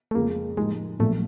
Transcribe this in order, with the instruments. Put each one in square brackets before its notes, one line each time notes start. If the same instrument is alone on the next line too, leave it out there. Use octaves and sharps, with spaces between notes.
[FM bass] A3
[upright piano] F2 C#3 F3 G#3 [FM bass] A#3
[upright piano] A2 F3 A#3 D#4 G4 [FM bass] G#3
[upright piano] A#1 A#2 F#3 B3 [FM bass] A3